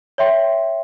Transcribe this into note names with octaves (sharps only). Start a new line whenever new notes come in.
C#5 E5 G5 C6